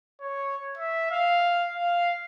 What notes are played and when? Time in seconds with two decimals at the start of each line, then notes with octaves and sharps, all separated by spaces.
0.21 C#5
0.78 E5
1.11 F5
1.76 F5